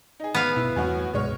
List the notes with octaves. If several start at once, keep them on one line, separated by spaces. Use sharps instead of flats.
D#4 G#4
B3 F5
G1 B2 E4
E2 A2 G3 C4 F#4 G#5
C#2 G2 B2 G#3 C#5 F6